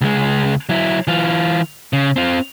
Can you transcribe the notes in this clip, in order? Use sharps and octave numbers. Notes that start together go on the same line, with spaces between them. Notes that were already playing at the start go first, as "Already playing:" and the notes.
C#2 G#3
F#3 E4
E3 F4
C#3
C4 F4